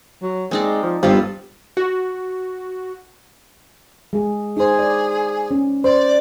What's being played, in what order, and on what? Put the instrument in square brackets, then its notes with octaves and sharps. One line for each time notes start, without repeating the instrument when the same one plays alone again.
[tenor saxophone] F#3
[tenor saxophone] G#3 [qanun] C4 D#4 D5
[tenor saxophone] F3
[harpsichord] G2 [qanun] B3 F4 A4 [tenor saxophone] C4
[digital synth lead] F#4
[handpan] G#3 G#4
[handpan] D#4 C5 [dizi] G#4
[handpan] D5
C#4
[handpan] C5 [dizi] D5